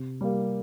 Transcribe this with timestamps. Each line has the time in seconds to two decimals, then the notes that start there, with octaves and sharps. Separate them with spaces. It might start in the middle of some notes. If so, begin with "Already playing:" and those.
Already playing: C3
0.21 G3 A#3